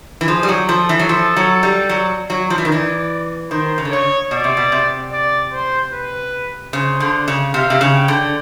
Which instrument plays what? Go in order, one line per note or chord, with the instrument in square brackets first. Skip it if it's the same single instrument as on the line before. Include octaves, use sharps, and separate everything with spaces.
[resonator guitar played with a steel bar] E3
[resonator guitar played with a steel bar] F3 [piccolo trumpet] G#4
[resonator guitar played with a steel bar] G3
F#3
[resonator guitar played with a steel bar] F3 [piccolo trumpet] A4
[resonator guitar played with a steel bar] E3
F#3
F3
F#3
G3
F#3
F#3
F3
E3
D#3
[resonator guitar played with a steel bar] E3 [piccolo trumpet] D5
[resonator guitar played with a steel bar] D#3 [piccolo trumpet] C5
[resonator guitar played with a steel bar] C#3
D3
[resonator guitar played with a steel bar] C#3 [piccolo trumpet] C#5
[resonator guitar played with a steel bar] B2 [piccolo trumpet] D5
[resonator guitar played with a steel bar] C3
B2
C3
[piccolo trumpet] D5
C5
B4
[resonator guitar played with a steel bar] C#3 [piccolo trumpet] C5
[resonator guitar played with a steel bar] D3
C#3
[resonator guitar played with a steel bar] C3 [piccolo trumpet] F5
[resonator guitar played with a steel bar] C3
C#3
[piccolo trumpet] G5
[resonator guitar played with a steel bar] D3